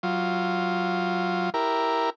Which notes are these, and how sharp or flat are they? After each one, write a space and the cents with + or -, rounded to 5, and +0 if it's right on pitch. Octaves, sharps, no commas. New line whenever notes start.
F#3 +10 F4 +0
E4 +0 G4 +0 A#4 +0